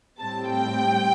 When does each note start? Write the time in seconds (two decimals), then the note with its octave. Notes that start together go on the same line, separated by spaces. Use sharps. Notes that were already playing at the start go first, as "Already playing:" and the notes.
0.20 A2 G3 C4 A5
0.50 G5